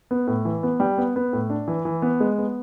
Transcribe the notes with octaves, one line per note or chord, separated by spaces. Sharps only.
B3
A2
E3
B3
G3
B3
B3
A2
D4
E3
E3
B3
G#3
B3